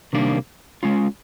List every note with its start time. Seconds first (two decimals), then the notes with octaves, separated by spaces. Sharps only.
0.13 C3 D#3 G3 A#3 D4
0.83 G#3 C#4 F4